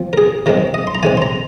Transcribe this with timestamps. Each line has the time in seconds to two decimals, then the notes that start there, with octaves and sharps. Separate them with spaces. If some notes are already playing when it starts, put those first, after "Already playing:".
Already playing: F3 C4
0.13 A#4
0.18 G#4
0.46 D#3 G#3 C4 A#4
0.74 D#5
0.87 C6
0.95 A#5
1.03 D#3 G#3 C4 G#5
1.17 C6
1.22 A#5